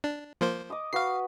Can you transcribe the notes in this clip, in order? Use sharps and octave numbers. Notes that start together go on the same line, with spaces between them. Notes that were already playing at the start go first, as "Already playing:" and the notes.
D4
F3 A#3 C5
D#5 D6 D#6
F#4 B4 F5 C7